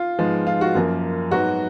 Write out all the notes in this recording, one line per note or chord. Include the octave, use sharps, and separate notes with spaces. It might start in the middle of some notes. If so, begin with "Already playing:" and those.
Already playing: F4
G#2 F3 G#3 B3
F4
F#4
F#2 F3 A#3
G#2 F#3 B3 F#4